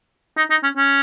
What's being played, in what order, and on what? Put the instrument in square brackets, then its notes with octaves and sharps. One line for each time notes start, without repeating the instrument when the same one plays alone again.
[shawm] D#4
D#4
C#4
C#4